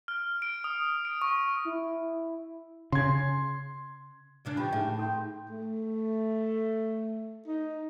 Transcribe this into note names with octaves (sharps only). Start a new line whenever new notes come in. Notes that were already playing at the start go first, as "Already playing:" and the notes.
F6
D7
D#6
D7
C#6
E4
C#3 C6 G#6
E2 C#3 D4
F3 G4 G5 B5
A2 D#4 G#4 E5
D#4 A4 G5 C6
A3
D#4